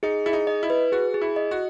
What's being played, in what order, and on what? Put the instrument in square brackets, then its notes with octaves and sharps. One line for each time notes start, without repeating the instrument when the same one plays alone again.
[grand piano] D#4 [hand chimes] G#4
[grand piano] E4 [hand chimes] G#4
[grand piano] D#4
[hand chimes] D#5
[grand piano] E4
[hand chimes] B4
[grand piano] F#4 [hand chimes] G#4
[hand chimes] G#4
[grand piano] E4
[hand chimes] D#5
[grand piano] F#4